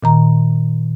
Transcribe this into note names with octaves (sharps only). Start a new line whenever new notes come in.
A#2 D#3 A#5